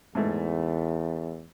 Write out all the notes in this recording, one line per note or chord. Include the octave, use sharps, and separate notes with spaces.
E2 G#2 A3